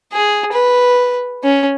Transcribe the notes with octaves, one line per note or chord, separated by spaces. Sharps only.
G#4
B4
C#4